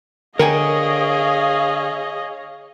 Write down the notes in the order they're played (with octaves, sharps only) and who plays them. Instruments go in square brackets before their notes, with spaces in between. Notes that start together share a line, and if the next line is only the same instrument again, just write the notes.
[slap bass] D3 [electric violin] G#4 D#5 [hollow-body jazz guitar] A#4 G5 G#5 [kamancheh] C#5 F5